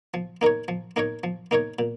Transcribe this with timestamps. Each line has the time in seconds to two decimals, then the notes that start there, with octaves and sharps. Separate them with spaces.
0.14 F3
0.41 A#3 D#4 A#4 C#5
0.68 F3
0.96 A#3 D#4 A#4 C#5
1.24 F3
1.51 A#3 D#4 A#4 C#5
1.79 A#2